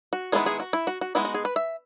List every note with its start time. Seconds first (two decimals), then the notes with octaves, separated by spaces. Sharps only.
0.13 F#4
0.32 D#3 G#3 B3 E4 G#4
0.46 G#4
0.60 F#4
0.73 E4
0.87 F#4
1.01 F#4
1.15 G#3 B3 D#4 E4
1.25 F#4
1.34 G#4
1.45 B4
1.56 E5